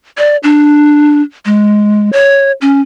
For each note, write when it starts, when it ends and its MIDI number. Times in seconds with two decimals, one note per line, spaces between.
0.18 0.37 74
0.43 1.21 62
1.46 2.10 56
2.13 2.52 73
2.61 2.81 61